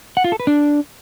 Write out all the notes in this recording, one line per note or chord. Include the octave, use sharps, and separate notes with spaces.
F#5
F4
A4
B4
D4